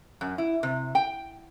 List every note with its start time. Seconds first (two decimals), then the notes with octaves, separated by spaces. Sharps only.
0.21 F#2
0.38 E4
0.63 C3
0.95 G5